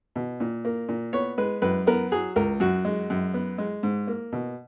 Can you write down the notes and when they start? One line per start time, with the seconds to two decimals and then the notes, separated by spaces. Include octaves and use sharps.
0.16 B2
0.40 A#2
0.65 A#3
0.89 A#2
1.13 B3 C#5
1.38 G#3 B4
1.62 F#2 B4
1.87 B3 A#4
2.12 F#3 G#4
2.36 C#2 A#4
2.60 F#2 F#4
2.85 G#3
3.10 F#2
3.34 B3
3.58 G#3
3.83 G#2
4.07 A#3
4.32 B2